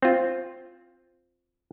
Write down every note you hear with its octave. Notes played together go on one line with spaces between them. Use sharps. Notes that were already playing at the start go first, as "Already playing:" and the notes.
C4 F4